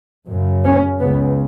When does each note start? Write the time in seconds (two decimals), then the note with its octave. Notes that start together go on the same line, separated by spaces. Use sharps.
0.29 F#2 C#3
0.64 C#4
0.99 C#2 C#3 B3